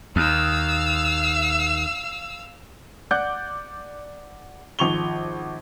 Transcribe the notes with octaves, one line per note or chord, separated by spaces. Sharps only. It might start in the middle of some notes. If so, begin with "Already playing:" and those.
D#2 F5 E6
D5 F#5 D6 F#6 G6
G#1 F3 C#6 F7 G7